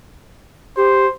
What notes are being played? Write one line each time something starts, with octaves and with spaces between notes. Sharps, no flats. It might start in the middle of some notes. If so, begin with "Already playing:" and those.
G4 C5